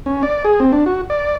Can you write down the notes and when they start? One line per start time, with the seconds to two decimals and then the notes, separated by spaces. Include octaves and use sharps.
0.06 C#4
0.23 D5
0.45 G#4
0.60 C4
0.73 D4
0.86 F#4
1.10 D5